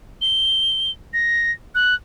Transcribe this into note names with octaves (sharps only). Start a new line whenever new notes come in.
G7
A#6
F#6